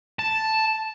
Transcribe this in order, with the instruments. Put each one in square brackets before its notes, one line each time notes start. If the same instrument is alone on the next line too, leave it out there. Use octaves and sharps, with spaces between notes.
[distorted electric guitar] A5